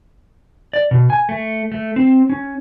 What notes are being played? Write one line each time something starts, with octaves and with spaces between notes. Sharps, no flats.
D5
B2
G#5
A3
A3
C4
C#4